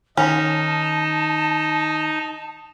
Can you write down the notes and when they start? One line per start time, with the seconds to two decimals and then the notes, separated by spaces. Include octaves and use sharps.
0.17 D#3 C#4 D#4 A5